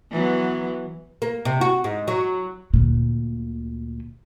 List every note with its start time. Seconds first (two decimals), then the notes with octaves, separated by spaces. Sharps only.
0.11 E3 F#3 B3
1.22 A#3
1.45 C3
1.61 F#4
1.84 G#2
2.08 F#3
2.74 D2 A#2